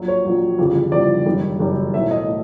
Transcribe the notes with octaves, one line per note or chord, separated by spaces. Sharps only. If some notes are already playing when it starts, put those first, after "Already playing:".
Already playing: A#1 A#2 F#3
C#5
A#1 A#2 F#3
G1 F2 C#3 E3 G3
G1 F2 C#3 E3 G3 D5
F#1 F#2 D#3 G3
F#1 F#2 D#3 G3
B1 A2 E3 A3 C4 E5
D#5
A2